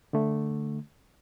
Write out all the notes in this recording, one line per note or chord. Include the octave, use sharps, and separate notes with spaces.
D3 A3